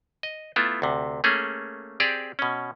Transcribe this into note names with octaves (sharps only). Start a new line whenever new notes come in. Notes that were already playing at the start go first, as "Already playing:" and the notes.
D#5
A3 B3 E4 F4
D2 C3
A3 A#3 C#4 G#4
C4 G4 G#4 D5
B2 C#4